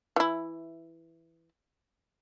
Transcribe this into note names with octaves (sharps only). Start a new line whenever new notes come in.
E3 E4